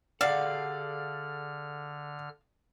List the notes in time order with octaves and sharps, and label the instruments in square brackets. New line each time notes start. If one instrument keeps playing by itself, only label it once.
[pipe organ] D3 F6 [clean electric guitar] G#4 A4 F#5 [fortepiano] D5 [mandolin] F5